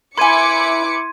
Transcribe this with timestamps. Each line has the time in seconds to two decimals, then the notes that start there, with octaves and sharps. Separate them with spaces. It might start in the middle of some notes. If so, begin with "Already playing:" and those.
0.17 E4 B4 G#5 C6 D6 G#6 C#7 D#7